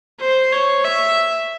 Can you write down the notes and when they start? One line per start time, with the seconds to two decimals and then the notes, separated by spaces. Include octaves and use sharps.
0.20 C5
0.52 C#5
0.84 E5